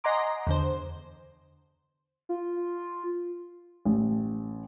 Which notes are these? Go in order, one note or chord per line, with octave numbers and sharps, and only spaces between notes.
D#5 F#5 G#5 A#5 C6 D6
E2 D3 C5
F4
A1